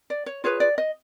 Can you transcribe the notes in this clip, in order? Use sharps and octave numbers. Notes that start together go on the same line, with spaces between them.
D5
C#5
F4 G#4 B4 C#5
D5
D#5